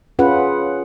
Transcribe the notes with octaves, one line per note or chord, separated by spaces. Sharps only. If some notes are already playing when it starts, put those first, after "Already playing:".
C#4 F4 G#4 B4 F#5